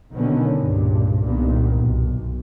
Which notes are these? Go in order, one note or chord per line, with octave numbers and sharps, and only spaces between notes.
B2 D3 D#3 F#3 B3 C#4
C#2 G2 A#2
C2 G2 A#2 D#3 B3
B1